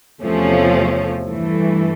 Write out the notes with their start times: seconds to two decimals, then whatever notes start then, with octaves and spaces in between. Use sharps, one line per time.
0.21 E2 C3 F3 A3 C#4
1.27 G2 E3 A3